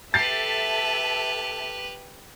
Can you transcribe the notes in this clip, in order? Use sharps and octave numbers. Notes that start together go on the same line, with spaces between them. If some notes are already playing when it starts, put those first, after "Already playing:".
G4 A4 B4 E5 A5 A6 C7